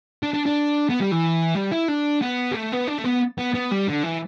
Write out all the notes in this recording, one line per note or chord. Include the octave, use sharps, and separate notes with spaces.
D4
D4
D4
B3
G3
E3
G3
E4
D4
B3
G3
A3
B3
D4
A3
B3
B3
B3
G3
D3
E3